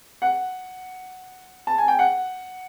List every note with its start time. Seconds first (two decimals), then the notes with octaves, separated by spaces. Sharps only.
0.22 F#5
1.67 A5
1.78 G#5
1.88 G5
1.99 F#5